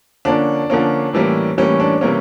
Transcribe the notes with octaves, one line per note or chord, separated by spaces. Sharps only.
D3 F3 A#3 C#4 D4
D3 F3 A#3 C#4
A2 E3 G3 A#3 C#4
A2 E3 G3 A#3 C#4
D4
C3 E3 G3 A#3 C#4